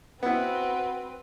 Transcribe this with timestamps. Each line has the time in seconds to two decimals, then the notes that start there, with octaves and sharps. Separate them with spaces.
0.23 B3 C4 E4 F#4 B4